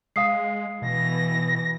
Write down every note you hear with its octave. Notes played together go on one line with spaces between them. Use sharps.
G#3 F5 D#6 C7
B2 E3 A#6